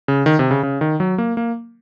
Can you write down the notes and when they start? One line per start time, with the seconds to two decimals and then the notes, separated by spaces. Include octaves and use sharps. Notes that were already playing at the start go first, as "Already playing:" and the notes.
0.08 C#3
0.26 D#3
0.39 C3
0.51 C#3
0.63 C#3
0.81 D#3
1.00 F#3
1.18 A#3
1.37 A#3